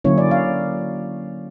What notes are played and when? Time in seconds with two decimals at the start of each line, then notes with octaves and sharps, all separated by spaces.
0.04 D3 F#3 A#3 C#4 E4 C#5
0.18 D5
0.31 F5